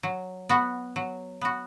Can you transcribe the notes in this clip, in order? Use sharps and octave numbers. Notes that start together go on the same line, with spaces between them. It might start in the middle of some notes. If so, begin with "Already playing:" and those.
F#3
B3 F#4
F#3
B3 F#4